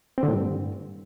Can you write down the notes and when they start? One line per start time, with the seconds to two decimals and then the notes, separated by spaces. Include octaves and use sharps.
0.18 C4
0.23 D3
0.28 A2
0.33 G2